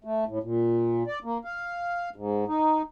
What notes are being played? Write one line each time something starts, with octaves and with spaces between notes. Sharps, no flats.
A3
A2
A#2
D5
A#3
F5
G#2
D#4